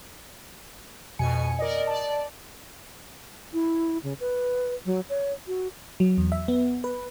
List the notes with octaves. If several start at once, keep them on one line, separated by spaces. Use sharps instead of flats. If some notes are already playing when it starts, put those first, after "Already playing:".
F2 B2 G#5 C#7
A#4 D5 D#5
D5 A5
E4
C#3
B4
F#3
C#5
F#4
F#3
E2
E5
B3
B4